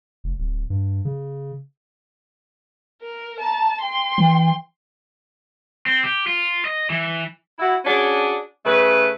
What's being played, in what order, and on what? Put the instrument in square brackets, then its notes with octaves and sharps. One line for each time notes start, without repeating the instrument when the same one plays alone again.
[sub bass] F1
D1
G2
C#3
[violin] A#4
[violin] A5 [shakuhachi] A#5
[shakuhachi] G5 [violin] C6
[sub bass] E3
[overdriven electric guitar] C4
G4
F4
D#5
E3
[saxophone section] E4 F#4
C#4 D4 F#4 G#4
C#3 A3 B4